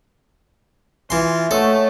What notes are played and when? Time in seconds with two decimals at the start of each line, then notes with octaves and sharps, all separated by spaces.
1.10 E3 F4 E5 G#5 C6
1.51 A3 A4 C#5 D#5 F#5